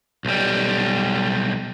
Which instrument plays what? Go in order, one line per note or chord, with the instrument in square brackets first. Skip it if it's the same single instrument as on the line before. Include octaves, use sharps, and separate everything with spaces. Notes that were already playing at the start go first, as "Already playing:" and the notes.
[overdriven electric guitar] B1 G3